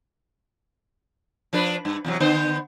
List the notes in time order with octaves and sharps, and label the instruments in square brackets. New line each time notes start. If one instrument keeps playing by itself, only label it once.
[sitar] F3 D4 B4
G2
E2 C3 F#3
D3 B3 C5